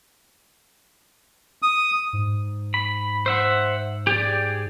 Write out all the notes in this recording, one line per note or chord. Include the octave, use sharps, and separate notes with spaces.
D#6
G#2
B5
C5 E5 F#5
G4 G#4 D5